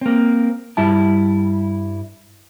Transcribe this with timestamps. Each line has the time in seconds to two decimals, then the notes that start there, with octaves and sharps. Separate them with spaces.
0.01 A#3 C4
0.77 G2 G3 E4 A5